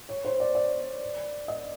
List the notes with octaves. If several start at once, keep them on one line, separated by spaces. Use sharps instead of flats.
C#5
C5
D5
D5
D#5